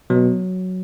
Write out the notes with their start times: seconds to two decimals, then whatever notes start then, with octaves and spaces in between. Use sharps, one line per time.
0.10 B2 F#3